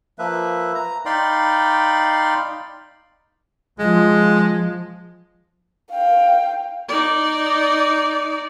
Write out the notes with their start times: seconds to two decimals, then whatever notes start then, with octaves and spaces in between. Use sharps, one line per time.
0.19 F3 A#3 B4 E5
0.75 A#5
1.06 D#4 D5 F5 G5 B5 C6
3.79 F3 G#3
5.91 F5 G5
6.89 D#4 D5